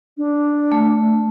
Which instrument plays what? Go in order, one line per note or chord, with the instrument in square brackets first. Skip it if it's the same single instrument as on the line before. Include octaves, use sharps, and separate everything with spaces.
[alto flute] D4
[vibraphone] A3